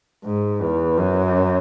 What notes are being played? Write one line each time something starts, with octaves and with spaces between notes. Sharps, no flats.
G#2
E2
F#2